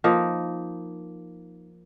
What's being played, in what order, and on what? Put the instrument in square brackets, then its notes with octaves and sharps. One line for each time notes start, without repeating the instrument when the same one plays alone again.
[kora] F3 A#3 D#4 A#4